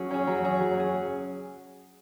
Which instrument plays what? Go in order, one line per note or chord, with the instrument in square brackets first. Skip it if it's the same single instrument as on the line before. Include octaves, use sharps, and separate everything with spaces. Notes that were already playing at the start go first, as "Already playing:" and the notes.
Already playing: [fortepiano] F#3 C#4 G#4
C#4 G#4
F#3
C#4 G#4
F#3
C#4 G#4